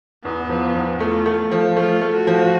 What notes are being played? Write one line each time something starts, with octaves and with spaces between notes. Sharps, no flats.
E2 B3
F3
E2
A3 F4
A3
F3
A3 F4
A3
F#4
F3